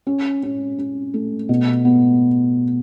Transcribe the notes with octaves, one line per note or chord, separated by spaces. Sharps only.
C#4
C#4
C#4
A3
B2
B3